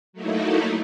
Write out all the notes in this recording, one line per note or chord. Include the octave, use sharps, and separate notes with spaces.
F#3 A3 A#3 D#4 E4